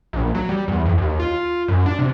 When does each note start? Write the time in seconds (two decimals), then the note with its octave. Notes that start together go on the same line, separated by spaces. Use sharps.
0.13 A#1
0.35 F#3
0.49 G3
0.68 E2
0.86 F2
0.98 D#2
1.20 F4
1.68 F#2
1.86 D4
1.99 C3